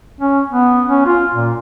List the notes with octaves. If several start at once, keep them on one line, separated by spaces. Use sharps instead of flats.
C#4
B3
C#4
F4
A#2